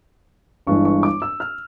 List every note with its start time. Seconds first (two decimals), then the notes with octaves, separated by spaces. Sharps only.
0.67 G1 G2 E3 G#3 C#6
0.85 C#6
1.03 D6
1.22 E6
1.40 F6